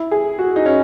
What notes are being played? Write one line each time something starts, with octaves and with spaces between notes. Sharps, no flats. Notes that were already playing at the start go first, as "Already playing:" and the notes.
Already playing: E4
G#4
F#4
D#4
C#4